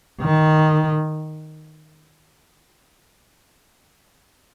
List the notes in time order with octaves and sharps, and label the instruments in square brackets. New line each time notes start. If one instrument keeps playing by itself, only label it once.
[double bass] D#3